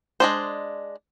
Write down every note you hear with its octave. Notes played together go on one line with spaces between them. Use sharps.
G#3 D4 C5